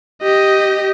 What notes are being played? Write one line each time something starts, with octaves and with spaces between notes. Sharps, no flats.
G4 D#5